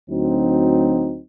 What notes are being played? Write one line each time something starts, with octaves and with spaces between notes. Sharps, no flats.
D2 F#3 C4 D#4